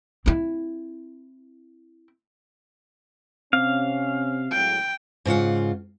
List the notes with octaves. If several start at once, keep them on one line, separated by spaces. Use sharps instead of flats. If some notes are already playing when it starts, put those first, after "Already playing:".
C4 E4
C3 C4 C#4 F5
A2 F#3 G#3 G5
G#2 C#3 F4 F#5